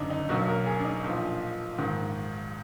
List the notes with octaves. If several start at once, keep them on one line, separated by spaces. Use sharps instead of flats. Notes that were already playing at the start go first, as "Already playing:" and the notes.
Already playing: F#1 F#2 D3 D4 D#4
D#4
B1 B2 F#3 A#3 F#4
A#4
G#4
D4
D#4
B1 A#2 F3
A#1 G#2 D#3